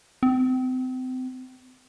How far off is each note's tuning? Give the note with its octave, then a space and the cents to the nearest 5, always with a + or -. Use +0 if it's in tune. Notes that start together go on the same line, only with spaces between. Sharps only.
C4 -35